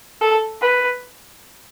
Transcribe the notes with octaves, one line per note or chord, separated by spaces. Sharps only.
A4
B4